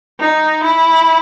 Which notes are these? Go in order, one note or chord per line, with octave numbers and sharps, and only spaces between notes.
D#4
E4